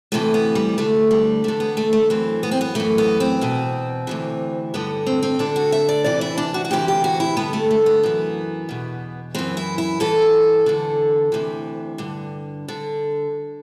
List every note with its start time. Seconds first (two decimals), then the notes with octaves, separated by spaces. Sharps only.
0.12 D2 C3 E3 A3
0.34 B3
0.55 G3
0.78 D2 D3 A3
1.11 G3
1.44 E2 D3 A3
1.60 B3
1.77 A3
1.93 A3
2.10 F#2 E3 C4
2.43 B3
2.51 C4
2.61 B3
2.75 F#2 E3 A3
2.98 B3
3.20 C4
3.41 E2 B2
4.07 D2 C3 E3
4.74 G2 D3 B3
5.07 C4
5.23 C4
5.39 D2 D3 D4
5.56 F#4
5.72 E5
5.89 D5
6.04 D2 C3 E3 D5
6.21 E4
6.38 D4
6.54 F#4
6.65 F#4
6.71 D2 C3 E3 G4
6.88 G4
7.04 F#4
7.20 E4
7.36 G2 D3 B3
7.53 A3
7.71 A3
7.86 B3
8.03 F#2 E3
8.69 E2 B2
9.35 F#2 E3 C4
9.57 E4
9.78 E4
10.00 G2 E3 A4
10.66 E2 D3
11.32 D2 C3 E3
11.98 G2 D3
12.68 D3